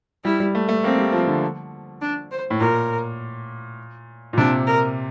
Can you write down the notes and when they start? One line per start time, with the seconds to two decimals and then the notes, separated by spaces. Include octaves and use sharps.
0.24 G3 E4
0.40 G3
0.55 A3
0.69 A3
0.83 A#3 C4
0.98 G3
1.13 F3
1.27 D3
2.01 D4
2.31 C5
2.50 A2
2.60 A#2 A#4
4.33 A#2
4.38 C3 D4
4.67 A#4